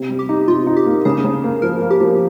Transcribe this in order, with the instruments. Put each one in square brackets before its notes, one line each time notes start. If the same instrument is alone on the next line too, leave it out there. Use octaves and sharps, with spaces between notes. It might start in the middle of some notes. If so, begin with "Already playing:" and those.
Already playing: [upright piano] C3
G3
[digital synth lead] G4
[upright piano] D#4
[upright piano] C3 [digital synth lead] F4
[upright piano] D#4
[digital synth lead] G4
[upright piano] A#3
[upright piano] C#3 [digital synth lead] G#4
[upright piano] C#3
A#3
[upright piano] F3 [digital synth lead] A#4
[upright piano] A#3
[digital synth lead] G4
[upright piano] F3